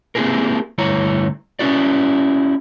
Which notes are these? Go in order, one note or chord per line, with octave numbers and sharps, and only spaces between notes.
A#3 C4 E4 G4 G#4 A#4
D2 G2 E4 C#5 A#5
C#4 E4 F#4 D5